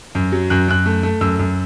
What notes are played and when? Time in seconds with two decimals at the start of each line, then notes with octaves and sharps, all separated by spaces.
0.15 F#2
0.32 F#3
0.50 F#2 F#6
0.68 F#2 F#6
0.86 A3
1.03 A3
1.21 F#2 E6
1.39 F#2